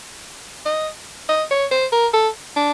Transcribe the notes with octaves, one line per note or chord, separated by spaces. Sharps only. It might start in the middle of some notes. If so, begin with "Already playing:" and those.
D#5
D#5
C#5
C5
A#4
A4
D4